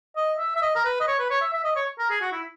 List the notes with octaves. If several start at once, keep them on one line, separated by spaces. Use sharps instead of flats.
D#5
E5
E5
D#5
A#4
B4
D#5
C#5
B4
C#5
E5
E5
D#5
C#5
A#4
G#4
F#4
E4